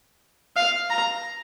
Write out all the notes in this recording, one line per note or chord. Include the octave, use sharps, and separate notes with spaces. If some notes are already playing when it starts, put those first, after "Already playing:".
F5
A#5